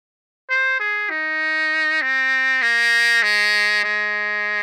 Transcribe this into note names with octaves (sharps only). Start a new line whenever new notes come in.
C5
G#4
D#4
C4
A#3
G#3
G#3